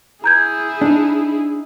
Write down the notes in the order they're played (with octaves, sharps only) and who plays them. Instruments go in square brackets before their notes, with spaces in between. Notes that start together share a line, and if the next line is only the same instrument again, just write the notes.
[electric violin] E4 G#4 [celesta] A#5 G6 G#6
[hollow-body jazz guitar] D4 D#4